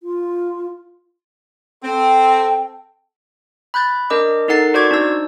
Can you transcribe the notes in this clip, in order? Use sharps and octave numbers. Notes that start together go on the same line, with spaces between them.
F4
C4 A4 G5
B5 F#6 G6 A6
D4 A#4 D#5 D6
D#4 A4 A#4 F#5 A6 C7
F#4 C5 D5 C#6 D6 G#6
D4 D#4 E6